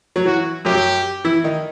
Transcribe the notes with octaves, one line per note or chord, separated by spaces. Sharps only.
F#3
E3 F#4
F#2 F#3 G4
E3 E4
D#3 D#4